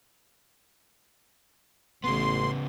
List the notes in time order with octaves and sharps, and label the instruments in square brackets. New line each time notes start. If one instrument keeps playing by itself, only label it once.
[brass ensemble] A1 [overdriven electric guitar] C#3 B3 [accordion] C6